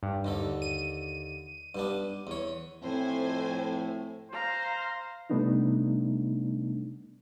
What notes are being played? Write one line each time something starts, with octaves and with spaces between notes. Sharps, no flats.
G2
D#2 D3 A4
D#7
G2 B3 D4
E2 C#5
F2 A2 C4 C5 G#5
C5 F5 A#5 C6
C3 G3 A3 B3 D4 D#4